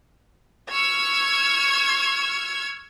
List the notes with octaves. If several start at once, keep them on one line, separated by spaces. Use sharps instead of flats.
C#6 E6 F6 G#6